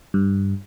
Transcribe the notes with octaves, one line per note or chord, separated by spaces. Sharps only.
G2